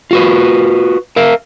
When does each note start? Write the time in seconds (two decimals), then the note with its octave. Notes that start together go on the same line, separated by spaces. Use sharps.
0.11 F4 F#4 B4
1.16 A#4 E5 F5